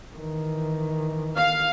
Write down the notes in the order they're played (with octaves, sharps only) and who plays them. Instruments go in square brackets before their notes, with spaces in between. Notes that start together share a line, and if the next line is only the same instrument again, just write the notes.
[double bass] D#3 E3
[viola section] F5